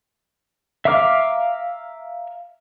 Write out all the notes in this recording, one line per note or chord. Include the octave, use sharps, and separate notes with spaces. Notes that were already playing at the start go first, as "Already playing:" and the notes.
E5 F5 A#5 D6 F6